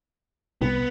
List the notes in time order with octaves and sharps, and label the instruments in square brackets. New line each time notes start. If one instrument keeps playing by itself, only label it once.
[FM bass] C2 [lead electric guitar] B3